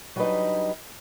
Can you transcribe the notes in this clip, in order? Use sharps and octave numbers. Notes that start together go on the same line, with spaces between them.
F#3 G3 D4 D#4 B4 D#5